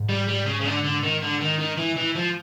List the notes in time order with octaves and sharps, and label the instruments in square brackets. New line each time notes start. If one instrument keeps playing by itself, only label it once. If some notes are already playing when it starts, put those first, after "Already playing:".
Already playing: [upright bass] G#2
[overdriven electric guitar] G3
G3
C#3
C#3
D3
D3
D#3
D3
D#3
D#3
E3
E3
F3